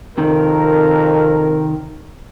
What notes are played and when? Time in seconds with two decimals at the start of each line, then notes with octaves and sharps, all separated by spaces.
0.18 F2 C3 D#3 A#4